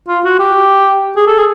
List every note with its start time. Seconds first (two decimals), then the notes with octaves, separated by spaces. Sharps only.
0.08 F4
0.24 F#4
0.39 G4
1.16 G#4
1.27 A4
1.38 G#4